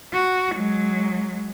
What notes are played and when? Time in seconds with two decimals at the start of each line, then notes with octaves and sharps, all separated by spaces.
0.13 F#4
0.55 F#3 G#3